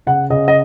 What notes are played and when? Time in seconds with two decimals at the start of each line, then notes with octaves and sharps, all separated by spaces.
0.07 C#3 F#5
0.30 C#3 D#5
0.48 D#5